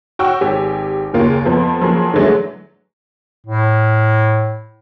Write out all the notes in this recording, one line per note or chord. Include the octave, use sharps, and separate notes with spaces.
F#4 G5 C#6 E6
G#1 G4 G#5
F#1 D#2 C#3 A#3 C#4 F4
F2 F3 B3
F3 F#3 A#3 C#4 G#4
D3 E3 F#3 G#3 A3
A2